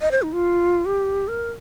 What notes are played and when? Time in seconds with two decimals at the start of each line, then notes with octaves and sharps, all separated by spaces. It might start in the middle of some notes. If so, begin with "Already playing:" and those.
0.01 D#5
0.11 C5
0.22 D#4
0.33 F4
0.85 G4
1.28 A#4